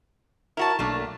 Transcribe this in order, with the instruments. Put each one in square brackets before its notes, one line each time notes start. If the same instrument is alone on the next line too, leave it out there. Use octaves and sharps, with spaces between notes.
[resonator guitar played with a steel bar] E4 F#4 C#5 [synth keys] A#4 A5
[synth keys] B1 [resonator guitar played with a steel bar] A3 A#3 D4